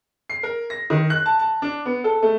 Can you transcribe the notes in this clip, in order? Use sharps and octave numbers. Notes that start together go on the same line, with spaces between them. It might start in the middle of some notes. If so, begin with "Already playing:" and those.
C7
A#4
A#6
D#3
F#6
A5
A5
D4
B3
A4
A3